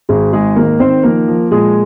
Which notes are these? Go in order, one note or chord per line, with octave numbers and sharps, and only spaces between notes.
G#1 G#3 G#4
G#2 G#3 G#4
D#3 A#3 A#4
D#3 C4 C5
F3 A#3 A#4
F3
A#2 G#3 G#4